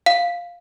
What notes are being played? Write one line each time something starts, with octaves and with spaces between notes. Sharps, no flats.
F5